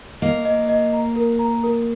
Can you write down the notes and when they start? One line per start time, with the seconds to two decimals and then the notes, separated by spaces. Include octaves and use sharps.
0.22 A#3 D#5
0.45 D#5
0.69 D#5
0.93 A#5
1.16 A#4
1.39 A#5
1.64 A#4